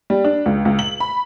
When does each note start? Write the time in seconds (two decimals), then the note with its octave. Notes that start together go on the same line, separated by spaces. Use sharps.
0.10 G3
0.24 D4
0.46 C#2
0.65 C#2
0.79 F#7
1.00 B5